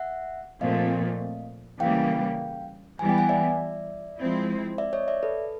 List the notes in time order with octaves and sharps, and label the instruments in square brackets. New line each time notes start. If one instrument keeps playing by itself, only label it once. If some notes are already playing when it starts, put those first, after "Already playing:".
Already playing: [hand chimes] E5 F#5
[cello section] A#2 F3 A3 C4 [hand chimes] D#5 F5
[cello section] C#3 E3 G3 A#3 [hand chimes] F5 G5
[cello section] E3 G3 B3 [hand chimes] G#5
[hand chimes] G5
F#5 G#5
D5 E5
[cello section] F3 G#3 C4 E4
[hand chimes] D5 E5
C#5 D#5
D5 E5
A4 B4